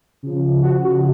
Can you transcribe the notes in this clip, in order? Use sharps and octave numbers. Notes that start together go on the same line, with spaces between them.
C#3 F3
F#4
F#4